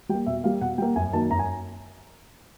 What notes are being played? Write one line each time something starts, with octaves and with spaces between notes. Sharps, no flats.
G3 A#3 G5
B2 E5
G3 A#3 F5
B2 F#5
G3 A#3 G5
F#2 G#5
D#3 F#3 A#3 A5
F#2 A#5
G#5